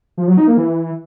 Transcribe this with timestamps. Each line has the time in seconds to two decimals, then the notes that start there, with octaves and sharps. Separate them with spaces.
0.18 F3
0.28 F#3
0.37 D#4
0.47 A#3
0.57 E3